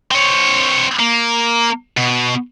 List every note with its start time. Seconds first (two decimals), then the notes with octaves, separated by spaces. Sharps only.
0.11 C4 C#5
0.99 A#3
1.97 B2